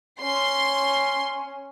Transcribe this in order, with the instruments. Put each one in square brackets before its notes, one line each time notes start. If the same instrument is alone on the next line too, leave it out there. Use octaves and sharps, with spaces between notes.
[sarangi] C#4 [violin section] C6